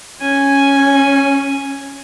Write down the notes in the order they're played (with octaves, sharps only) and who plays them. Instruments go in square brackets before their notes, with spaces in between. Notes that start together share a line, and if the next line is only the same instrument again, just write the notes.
[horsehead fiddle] C#4 [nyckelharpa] G#5